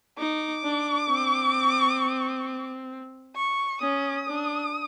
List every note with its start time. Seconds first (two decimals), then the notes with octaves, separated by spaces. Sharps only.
0.18 D#4 D6
0.63 D4
1.09 C4
3.36 C#6
3.82 C#4 D#6
4.27 D4